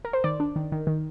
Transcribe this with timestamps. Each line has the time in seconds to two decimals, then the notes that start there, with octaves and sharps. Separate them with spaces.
0.05 A#4
0.13 C5
0.24 D#3 D5
0.40 D4
0.56 D#3
0.72 D#3
0.87 D#3